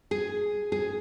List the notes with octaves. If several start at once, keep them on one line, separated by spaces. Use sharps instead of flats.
G#4
G#4